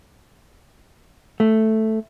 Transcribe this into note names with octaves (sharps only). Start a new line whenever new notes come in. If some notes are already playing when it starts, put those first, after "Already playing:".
A3